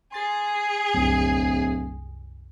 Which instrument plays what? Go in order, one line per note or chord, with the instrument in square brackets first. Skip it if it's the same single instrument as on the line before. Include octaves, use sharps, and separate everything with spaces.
[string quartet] G#4 [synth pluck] C6 A6 C7
[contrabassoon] D1 [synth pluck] C2 F#2